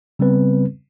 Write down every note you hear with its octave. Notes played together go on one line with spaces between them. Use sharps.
C#3 G3 B3 C4 B4